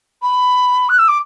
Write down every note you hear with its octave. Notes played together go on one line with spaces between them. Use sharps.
B5
F#6
E6
D6